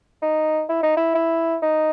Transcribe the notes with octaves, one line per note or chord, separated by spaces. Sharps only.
D#4
E4
D#4
E4
E4
D#4